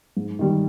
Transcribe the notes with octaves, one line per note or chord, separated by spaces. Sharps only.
G#2
D#3 G3